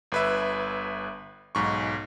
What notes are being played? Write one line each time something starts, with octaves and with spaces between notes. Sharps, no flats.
G1 B4 E5
B1 G#2 C#6